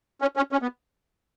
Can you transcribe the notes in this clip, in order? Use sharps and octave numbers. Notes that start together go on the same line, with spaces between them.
C#4
C#4
C#4
B3